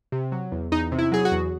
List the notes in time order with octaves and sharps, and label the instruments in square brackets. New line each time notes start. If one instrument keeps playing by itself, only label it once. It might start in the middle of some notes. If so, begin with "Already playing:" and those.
[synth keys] C3
F#3
E2
E2 D#4
C3
E4
F#3 G#4
F#4
E2